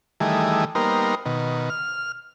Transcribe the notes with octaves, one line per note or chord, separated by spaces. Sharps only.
D#3 E3 G3 A3 G#4
G3 A#3 B3 D#4 A#4 C5
B2 D#3
F6